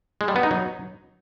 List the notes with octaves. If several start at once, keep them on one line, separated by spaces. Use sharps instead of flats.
G#3
G3
B3
D#4
F#3